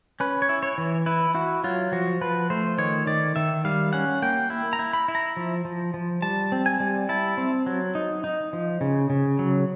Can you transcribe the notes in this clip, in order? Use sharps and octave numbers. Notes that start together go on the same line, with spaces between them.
C#4 B4
C#5
E4
C#5
E3
E4 B4
E4 F#4
F#3 F4
F3 F#4
F3 B4
A3 C5
D#3 C#5
D#3 D5
D#3 E5
G3 F5
C#4 F#5
A#3 G5
E4
A#5
E4
B5
E4
A#5
F3
F3
F3
G3 A5
C4
G#5
G3
E4 A5
C4
F#3
D#4
D#4
F3
C#3
C#3
F#3